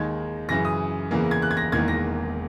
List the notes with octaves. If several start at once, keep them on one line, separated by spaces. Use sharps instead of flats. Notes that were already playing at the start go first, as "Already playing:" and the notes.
Already playing: D#2 D#3 G#3 D#4 G#6
F#2 C#3 E3 A#6
D#6
E2 C#3 E3 A#3
G#6
F#6
G#6
A#6
E1 E2 D#3 A#3 G#6
A#6